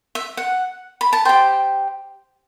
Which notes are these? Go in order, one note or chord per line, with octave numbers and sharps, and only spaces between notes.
E5
F#5
B5
A5
G4 C5 G5